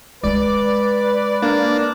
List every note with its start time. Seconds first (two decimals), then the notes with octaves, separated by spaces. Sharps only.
0.23 G#3 D#4 B4 D5
1.42 A#3 D4